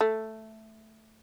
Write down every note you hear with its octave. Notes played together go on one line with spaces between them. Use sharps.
A3